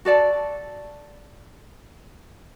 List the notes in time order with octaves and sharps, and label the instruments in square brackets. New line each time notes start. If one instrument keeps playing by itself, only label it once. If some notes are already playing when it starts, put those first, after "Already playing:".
[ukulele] F#4 A4 D5 A5